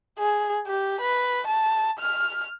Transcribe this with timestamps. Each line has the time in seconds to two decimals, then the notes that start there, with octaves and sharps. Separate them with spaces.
0.19 G#4
0.67 G4
1.01 B4
1.47 A5
1.99 F6